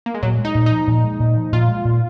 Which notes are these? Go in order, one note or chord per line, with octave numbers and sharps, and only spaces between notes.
A#3
G#3
A#2 F#3
G#3
D#4
A#2
F3 D#4
A#2
G#3
A#2
F3
A#2 F4
G#3
A#2